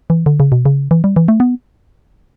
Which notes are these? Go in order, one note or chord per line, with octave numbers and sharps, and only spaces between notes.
E3
D3
C#3
B2
C#3
E3
G3
E3
A3
B3